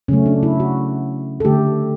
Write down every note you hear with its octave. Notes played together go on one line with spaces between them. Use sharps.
C#3 F#3 A3 C#4
D4
E4
F#4
A4
D3 A3 G4